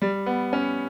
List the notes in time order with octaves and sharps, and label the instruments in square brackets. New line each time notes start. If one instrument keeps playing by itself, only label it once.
[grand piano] G3
B3
C#4